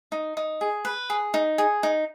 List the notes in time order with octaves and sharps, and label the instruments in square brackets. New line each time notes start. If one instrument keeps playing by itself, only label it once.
[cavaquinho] D#4
D#4
G#4
B4
G#4
D#4
G#4
D#4